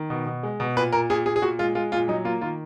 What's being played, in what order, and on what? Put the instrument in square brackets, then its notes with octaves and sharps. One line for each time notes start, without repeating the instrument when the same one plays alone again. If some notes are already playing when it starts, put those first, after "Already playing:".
Already playing: [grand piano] D#3
B2
B2
G#3
B2
A#2 B4
A#2 A#4
A#2 G#4
A#2 G#4
G#4
A#2 F#4
G#3 F4
G#3 F4
A#2 F4
F#3 D#4
A#3 F4
D#3 F4